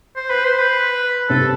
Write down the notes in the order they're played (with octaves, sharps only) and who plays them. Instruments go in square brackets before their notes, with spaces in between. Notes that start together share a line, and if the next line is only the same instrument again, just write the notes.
[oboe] C5
B4
C5
B4
[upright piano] C3 C4 [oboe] A4